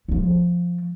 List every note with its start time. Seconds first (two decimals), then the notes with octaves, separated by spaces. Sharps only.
0.09 F3 A3